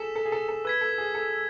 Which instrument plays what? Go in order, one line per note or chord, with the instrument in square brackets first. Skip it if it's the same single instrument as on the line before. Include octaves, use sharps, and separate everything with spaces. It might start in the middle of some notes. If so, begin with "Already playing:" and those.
Already playing: [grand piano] G#4 A4 [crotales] E6 B6 E7
[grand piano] A4
G#4
A4
A4
[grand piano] B4 [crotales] E6 G#6 B6
[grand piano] A4
G#4
A4